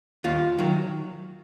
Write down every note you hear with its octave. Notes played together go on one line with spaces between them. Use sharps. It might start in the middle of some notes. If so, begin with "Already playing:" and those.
D#2 F4
D#3 F#3